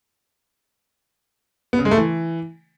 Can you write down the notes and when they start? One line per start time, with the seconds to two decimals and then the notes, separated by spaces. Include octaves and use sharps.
1.73 B3
1.79 C#3
1.85 G#3
1.91 A3
1.97 E3